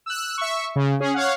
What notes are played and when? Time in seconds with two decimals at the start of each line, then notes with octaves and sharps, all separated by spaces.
0.06 E6 F#6
0.38 E5 C#6
0.76 C#3
1.00 C#4 G#4
1.14 C#5 F5 F#5